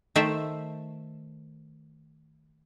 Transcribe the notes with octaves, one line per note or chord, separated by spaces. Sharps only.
D#3 A3 A4 C5 E5 A5